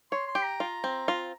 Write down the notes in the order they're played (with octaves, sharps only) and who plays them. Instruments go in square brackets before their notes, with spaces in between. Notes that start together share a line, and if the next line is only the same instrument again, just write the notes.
[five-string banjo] C#5 [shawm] C6
[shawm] C6
[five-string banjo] G4
[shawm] A#5
[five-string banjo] F4
C4
F4